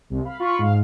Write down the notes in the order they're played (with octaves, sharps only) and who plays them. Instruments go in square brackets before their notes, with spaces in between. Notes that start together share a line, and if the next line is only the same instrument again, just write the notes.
[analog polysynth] C2
F5 B5
[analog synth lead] F4 [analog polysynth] B5 C#6
[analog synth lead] G#2 [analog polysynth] F5